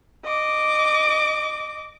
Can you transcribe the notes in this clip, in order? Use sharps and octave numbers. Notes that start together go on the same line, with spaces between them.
D#5 D6